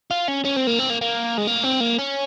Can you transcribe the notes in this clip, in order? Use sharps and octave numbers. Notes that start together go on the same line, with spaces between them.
F4
C#4
C#4
C4
A#3
C4
A#3
A#3
G#3
A#3
C4
A#3
C#4